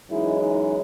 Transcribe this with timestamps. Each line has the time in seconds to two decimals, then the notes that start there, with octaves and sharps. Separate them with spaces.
0.10 F#2 E3 G#3 D#4 E4
0.42 D#4